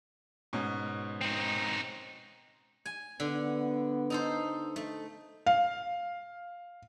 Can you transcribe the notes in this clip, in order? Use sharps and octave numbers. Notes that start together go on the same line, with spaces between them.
G#2 B2 C#4
C4 D#4
G#5
D3 B3
D#4 A4 C5
A3
F5